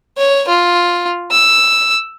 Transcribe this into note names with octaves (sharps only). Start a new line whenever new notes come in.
C#5
F4
E6